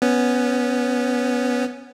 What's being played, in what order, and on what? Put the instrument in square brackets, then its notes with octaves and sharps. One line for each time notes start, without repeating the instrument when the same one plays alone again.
[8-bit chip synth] B3 C#4